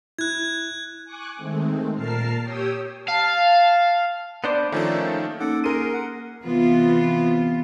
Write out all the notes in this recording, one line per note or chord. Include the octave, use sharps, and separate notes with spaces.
E4 F#6 G#6
G#5 C#6 D6 F#6
D#3 G#3 A3 C4
A#2 A#4 A5 F6 C7
G4 C#5 G5 D#6 E6
F5 A5
B3 D4 C5 D5 D6 D7
D#3 F3 A3 A#3 C#4 A4
A#3 C#4 D#4 A4 F#5 D6
G#4 A#4 C6 D#7
F#5
C3 E3 B3 F4